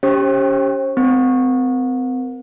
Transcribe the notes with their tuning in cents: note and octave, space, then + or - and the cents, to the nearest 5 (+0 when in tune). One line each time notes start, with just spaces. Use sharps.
C#4 +35 G4 +0 C5 +40
C4 -35 A#4 +0